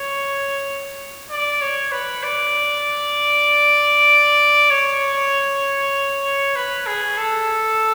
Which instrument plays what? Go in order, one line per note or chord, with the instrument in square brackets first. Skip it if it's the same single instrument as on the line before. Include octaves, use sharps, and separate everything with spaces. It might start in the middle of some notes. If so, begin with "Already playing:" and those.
Already playing: [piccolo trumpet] C#5
D5
C#5
B4
D5
C#5
B4
G#4
A4